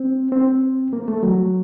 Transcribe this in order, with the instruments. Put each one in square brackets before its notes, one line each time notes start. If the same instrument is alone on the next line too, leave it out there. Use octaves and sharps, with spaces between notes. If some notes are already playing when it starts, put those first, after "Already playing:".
Already playing: [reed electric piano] C4
C4
A#3
A3
F#3